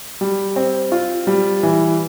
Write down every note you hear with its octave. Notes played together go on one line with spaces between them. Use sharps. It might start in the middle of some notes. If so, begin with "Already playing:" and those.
G3
C4
F4
G3
E3